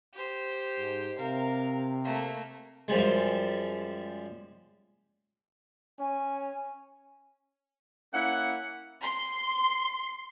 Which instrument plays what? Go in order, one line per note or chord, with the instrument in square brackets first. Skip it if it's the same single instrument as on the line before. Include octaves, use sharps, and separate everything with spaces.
[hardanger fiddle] G4 C5
[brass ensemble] G#2
[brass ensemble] C3 [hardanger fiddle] A#4 F5
[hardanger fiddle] A3 A#3
[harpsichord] F#2 F3 G3 G#3
[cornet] C#4 [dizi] G#5
[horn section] A#3 C#4 E4 F#5
[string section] C6